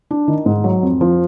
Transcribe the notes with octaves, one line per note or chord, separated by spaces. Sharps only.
D4
D#3
G#2
F#3
F2
F3